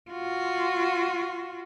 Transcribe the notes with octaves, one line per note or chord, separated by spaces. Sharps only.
F4 F#4